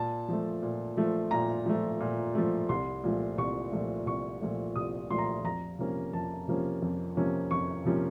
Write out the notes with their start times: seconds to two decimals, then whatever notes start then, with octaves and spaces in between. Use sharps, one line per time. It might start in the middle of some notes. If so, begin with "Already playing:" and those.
Already playing: A#2 A5
0.28 F3 A3
0.62 A#2
0.97 F3 A3
1.31 A#2 A#5
1.66 F3 A3
2.00 A#2
2.35 F3 A3
2.69 C2 C6
3.04 A#2 F3 A3
3.38 C2 C#6
3.72 A#2 F3 A3
4.06 C2 C#6
4.42 A#2 F3 A3
4.76 C2 D#6
5.10 A#2 F3 A3 C6
5.18 A#5
5.26 C6
5.44 F2 A#5
5.78 C3 F3 A#3 C#4
6.13 F2 A5
6.48 C3 F3 A#3 C#4
6.82 F2
7.17 C3 F3 A#3 C#4
7.51 F2 C#6
7.85 C3 F3 A#3 C#4